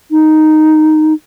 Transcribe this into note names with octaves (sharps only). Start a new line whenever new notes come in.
D#4